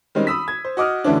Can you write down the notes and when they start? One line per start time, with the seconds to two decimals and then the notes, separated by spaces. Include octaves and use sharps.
0.15 D#3 G3 G#3 C4 C#4 D#4
0.27 B5 D#6 E6 B6
0.48 G#6
0.65 C5
0.77 F#4 D#5 D6 D#6 F6
1.04 D2 D3 E3 A3 C#4 D4